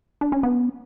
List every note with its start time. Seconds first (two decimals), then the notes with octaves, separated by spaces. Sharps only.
0.21 D4
0.32 C#4
0.43 B3